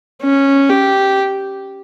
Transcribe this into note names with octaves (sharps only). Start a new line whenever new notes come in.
C#4
G4